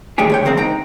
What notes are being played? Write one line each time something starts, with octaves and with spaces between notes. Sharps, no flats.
A2 D#3 G#3 A3 G4 G#4
D2 C#5 G5
E2 G#3 A#3 C4
D#4 G5 A#5